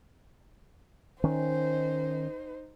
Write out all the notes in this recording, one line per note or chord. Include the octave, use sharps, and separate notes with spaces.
D#3 C#4 D#4 C5